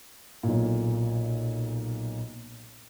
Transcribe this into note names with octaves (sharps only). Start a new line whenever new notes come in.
B1 A#2